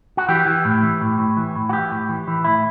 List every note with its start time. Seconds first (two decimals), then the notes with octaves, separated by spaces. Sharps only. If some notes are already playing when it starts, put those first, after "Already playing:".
0.17 F#4
0.28 E3 G4
0.46 E3
0.65 A2
0.83 E3
1.01 A2
1.19 A2
1.37 E3
1.55 A2
1.69 F#4
1.73 E3 G4
1.91 A2
2.09 E3
2.28 E3
2.44 A2 E4